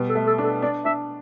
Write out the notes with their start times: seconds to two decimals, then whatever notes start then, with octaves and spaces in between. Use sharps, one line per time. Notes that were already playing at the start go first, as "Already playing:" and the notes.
Already playing: B2 G3
0.09 A4
0.15 A3
0.27 A4
0.38 D4
0.44 A4
0.62 D4 D5
0.85 D4 E5